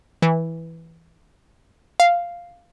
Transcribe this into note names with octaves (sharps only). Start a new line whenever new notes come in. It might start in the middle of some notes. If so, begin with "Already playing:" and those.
E3
F5